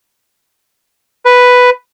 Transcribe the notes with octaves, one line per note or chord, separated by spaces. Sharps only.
B4